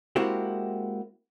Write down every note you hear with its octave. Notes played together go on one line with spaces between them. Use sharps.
G#3 A#3 C4 E4 F#4 G4